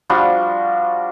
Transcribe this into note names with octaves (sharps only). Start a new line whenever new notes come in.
F3 G3 D4 F#4